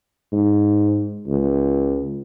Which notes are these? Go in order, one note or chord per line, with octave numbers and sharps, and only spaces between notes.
G#2
C#2